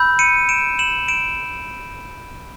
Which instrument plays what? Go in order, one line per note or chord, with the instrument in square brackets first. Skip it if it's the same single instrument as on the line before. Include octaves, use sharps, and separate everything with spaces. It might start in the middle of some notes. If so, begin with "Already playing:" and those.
Already playing: [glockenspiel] B5 E6 G6
C#7 D#7
D7 E7
E7 F#7
D7 E7